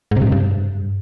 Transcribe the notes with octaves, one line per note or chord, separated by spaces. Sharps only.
G#2
C3
G2
C3
G2